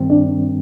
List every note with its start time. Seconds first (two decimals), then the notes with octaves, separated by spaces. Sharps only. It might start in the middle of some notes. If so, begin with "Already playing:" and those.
Already playing: G2 D#3 G3 C4
0.10 D4